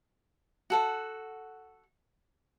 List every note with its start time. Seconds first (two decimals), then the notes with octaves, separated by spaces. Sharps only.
0.70 F#4 A4 F#5